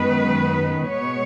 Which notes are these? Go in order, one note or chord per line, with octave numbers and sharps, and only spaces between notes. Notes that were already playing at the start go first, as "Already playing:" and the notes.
Already playing: F#2 D#3 G#3 B3 B4
B2 G#3 B3 C#5